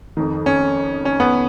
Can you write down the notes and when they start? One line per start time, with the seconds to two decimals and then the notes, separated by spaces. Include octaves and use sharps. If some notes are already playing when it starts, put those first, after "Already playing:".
0.17 F2 D#3
0.46 C#4
1.05 C#4
1.20 B3